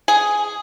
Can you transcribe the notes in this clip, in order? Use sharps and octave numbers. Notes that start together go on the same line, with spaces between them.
G#4